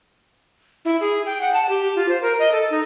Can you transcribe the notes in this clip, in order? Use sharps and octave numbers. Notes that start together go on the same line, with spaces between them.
E4
G#4
G5
F#5
A5
G4
F4
C5
A#4
D#5
A4
D#4